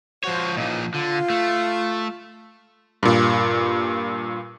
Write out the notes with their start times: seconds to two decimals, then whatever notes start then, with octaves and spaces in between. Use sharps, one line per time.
0.24 F3 F#4 C5 C#5
0.57 A#2 C#3 E3 F3 D#4
0.94 D3 F4
1.30 A3
3.03 G2 A#2